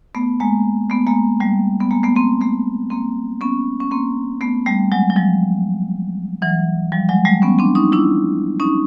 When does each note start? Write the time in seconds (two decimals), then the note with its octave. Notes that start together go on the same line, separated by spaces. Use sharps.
0.15 A3 B3
0.40 G#3 A#3
0.90 A3 B3
1.07 G#3 A#3
1.40 G3 A3
1.80 B3
1.91 G#3 A#3
2.03 A3 B3
2.16 A#3 C4
2.41 A3 B3
2.90 A#3 C4
3.41 B3 C#4
3.80 C#4
3.91 A#3 C4
4.41 A3 B3
4.66 G3 A3
4.92 F#3 G#3
5.10 F#3
5.16 F3 G3
6.42 E3 F#3
6.92 F3 G3
7.09 F#3 G#3
7.25 G3 A3
7.42 B3 C#4
7.59 C4 D4
7.75 C#4 D#4
7.92 D4 E4
8.60 C#4 D#4